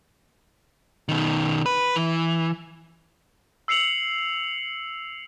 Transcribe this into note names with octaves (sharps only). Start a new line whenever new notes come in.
B2 D#3
B4
E3
E6 C7 C#7 F7 F#7